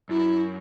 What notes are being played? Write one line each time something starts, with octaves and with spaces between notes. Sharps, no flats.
F#2 E4